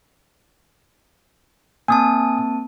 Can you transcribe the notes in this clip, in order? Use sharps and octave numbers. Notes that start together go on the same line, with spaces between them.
A#3 C4 G#5 A5 D#6